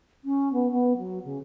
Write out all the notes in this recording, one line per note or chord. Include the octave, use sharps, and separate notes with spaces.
C#4
B3
B3
F#3
C#3